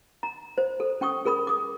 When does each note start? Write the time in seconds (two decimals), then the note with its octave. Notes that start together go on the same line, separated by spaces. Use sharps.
0.23 A#5
0.58 C5
0.80 A4
1.01 C#4 G5 C#6 D#6
1.25 G#4 A#4 B5 D#6
1.47 D6 D#6